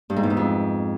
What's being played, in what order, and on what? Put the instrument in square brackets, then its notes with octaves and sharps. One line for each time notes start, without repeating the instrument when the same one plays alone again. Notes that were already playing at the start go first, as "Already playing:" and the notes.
[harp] G2
G#2
E2
G#2
F2